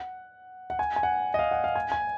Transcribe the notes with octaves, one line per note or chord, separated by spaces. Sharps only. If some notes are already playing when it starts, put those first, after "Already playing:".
Already playing: F#5
F#5
G#5
G#5
F#5
D#5
F5
F#5
F5
G#5
G#5